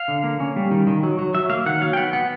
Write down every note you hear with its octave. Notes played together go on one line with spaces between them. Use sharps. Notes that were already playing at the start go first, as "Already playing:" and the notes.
Already playing: F5
D3
A#3
C#4
G3
D#3
D#3
F#3
F#3
F#3 E5
A#3 F5
D#3 F#5
F#3 F5
G5
B3 F#5
B3 F#5